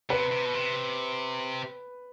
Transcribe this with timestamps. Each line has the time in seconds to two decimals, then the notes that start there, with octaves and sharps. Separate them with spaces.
0.10 C3 B4
0.32 C3
0.45 B2
0.54 C3